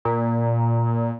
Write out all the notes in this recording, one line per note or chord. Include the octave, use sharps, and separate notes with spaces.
A#2